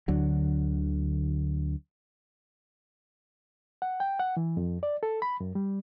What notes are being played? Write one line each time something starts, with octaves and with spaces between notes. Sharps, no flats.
D2 D3 F#3
F#5
G5
F#5
E3
F2
D5
A4
B5
F#2
G3